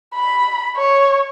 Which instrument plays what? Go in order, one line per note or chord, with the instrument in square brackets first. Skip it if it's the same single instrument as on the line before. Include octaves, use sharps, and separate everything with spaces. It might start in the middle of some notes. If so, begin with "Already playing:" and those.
[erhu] B5
C#5